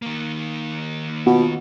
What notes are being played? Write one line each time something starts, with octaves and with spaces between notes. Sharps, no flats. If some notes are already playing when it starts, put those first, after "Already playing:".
D#3 A#3
B2 B3 F4 F#4